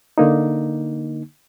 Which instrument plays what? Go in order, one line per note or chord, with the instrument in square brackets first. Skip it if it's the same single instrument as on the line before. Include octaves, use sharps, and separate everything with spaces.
[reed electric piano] D3 A#3 D#4